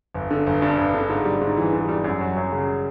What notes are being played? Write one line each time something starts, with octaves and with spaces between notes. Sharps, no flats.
G1
D3
G1
G2
G1
D3
G#2
G3
G#2
E3
G#2
G3
F#2
F#3
F#2
C#3